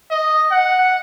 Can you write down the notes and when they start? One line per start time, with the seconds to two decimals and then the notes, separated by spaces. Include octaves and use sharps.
0.11 D#5
0.51 F#5